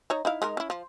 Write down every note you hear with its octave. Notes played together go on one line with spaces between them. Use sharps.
D#4 C#5 A#5
D#4 E4 F5
G#3 D#4 A#4
C#4 E4
F3